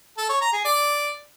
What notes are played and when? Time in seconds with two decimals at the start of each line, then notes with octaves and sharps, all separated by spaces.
0.18 A4
0.29 C#5
0.41 A#5
0.53 G#4
0.64 D5